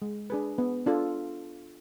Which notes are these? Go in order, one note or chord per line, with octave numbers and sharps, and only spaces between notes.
G#3
D4 G#4 B4
B3
D4 F4 A4